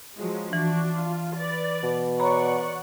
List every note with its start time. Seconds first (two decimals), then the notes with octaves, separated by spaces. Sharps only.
0.17 F3 F#3 G#3
0.53 E3 D4 F#4
0.99 F4
1.37 B4 D5 A6
1.83 B2
2.19 C#5 D5 F#5 A#5 B5 C#6